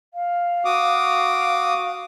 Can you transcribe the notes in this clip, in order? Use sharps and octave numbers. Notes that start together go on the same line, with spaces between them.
F5
F#4 D6 D#6